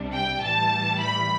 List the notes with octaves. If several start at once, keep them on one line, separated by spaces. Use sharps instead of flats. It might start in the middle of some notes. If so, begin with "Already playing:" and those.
Already playing: C2 C3 G3 D4
G5
A2 E3 G3 A5
B5